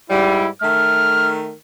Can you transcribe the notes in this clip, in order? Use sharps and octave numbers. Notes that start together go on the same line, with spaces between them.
G#2 G3 E4
D#3 A3 F6